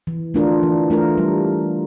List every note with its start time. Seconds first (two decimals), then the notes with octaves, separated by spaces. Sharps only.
0.07 E3
0.34 A3 D4 F4 A#4
0.63 E3
0.90 A3 D4 F4 A#4
1.18 G3